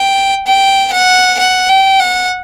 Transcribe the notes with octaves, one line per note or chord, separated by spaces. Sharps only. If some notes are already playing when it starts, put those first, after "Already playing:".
Already playing: G5
G5
F#5
F#5
G5
F#5